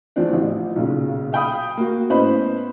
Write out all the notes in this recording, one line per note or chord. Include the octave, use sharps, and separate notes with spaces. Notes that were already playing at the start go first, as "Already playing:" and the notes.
E2 F3 C4 D4
A1 F3
B1 A#2 C#3
F5 G5 B5 D#6
A#3 F#4
A2 B3 C#4 C5 D#5 B5